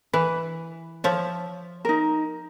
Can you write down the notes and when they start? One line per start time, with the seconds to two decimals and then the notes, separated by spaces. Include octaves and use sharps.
0.13 E3 B4
1.04 F3 C#5 E5
1.85 D#4 A#4